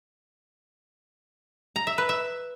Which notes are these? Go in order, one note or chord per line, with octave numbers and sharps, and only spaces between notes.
A#5
E5
B4
E5